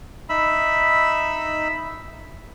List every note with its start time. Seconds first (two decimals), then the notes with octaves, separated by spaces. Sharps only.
0.29 D#4 E5 B5 E6